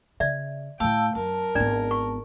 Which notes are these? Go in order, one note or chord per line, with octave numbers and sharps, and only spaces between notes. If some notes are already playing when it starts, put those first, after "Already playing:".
C#3 D5 E5
A2 A3 F5 G5 A5 E6
F#2 A#4 A5
G#1 B3 D4 D5
C#6